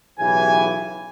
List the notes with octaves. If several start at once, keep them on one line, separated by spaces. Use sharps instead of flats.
B1 C#3 E3 E4 G4 G#5